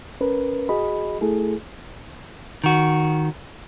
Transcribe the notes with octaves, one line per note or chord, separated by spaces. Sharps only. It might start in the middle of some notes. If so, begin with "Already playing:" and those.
C#4 A#4 B4
F#4 G#4 D#5 B5
A3 E4 G#4 A4
D#3 F#4